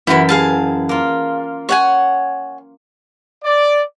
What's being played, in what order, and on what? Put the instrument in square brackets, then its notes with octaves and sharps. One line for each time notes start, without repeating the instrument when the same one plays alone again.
[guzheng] F#2 E3 [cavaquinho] E4 F#4 B5
[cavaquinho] G#4 F5 A5
[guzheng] A#3 F4
[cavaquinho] C#5 F#5 G#5
[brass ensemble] D5